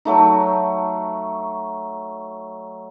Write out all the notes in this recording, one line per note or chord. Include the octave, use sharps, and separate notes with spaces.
F#3 A3 D#4